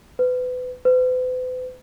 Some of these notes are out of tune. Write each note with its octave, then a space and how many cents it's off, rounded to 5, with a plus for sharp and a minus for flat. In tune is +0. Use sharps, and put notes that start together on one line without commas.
B4 +30
B4 +45